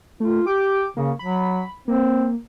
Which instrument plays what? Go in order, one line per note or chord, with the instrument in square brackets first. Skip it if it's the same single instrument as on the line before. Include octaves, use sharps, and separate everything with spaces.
[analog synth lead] A3 [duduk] F4
[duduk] G4 [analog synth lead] D6
[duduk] C#3 [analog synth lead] A#3
[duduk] F#3 [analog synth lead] B5
[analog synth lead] A#3 [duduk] C4